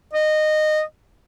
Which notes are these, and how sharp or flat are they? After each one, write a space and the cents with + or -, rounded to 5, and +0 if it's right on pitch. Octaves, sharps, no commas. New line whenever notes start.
D#5 -15